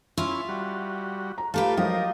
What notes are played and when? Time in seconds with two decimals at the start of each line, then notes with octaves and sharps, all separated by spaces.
0.18 C#4 E4 F4 E5
0.49 G3 F#4
1.38 A#5
1.54 A3 F4 G4 B4
1.77 F3 F#3 G4 A#4 D#5 F5